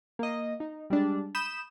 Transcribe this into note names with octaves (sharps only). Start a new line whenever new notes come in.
A#3 D#5
D#4
G3 G#3 D4
B5 D#6 G6 E7